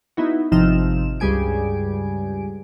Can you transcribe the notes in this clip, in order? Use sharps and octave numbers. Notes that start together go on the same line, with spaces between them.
B3 D#4 E4 F#4
G#1 C3 F3 D#4 F6 E7
C#2 G2 G3 G#4 G#5 D7